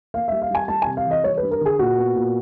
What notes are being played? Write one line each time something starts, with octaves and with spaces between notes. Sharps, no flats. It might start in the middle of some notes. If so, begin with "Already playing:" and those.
A#3 F5
G3 E5
F5
G3 G#5
G3 A5
C3 G#5
F5
E3
D#5
G3 C#5
B4
G2
A#4
D3 G#4
A#2 F#4
B3
A#2